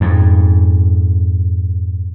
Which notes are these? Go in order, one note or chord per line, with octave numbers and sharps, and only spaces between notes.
F2 G#2